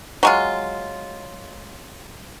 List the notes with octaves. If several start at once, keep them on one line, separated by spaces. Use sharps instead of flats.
F#3 G#3 F4